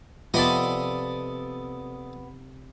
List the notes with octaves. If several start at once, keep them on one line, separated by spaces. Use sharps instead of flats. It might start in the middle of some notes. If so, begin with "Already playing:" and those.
C3 F3 B3 A4 D5 D#5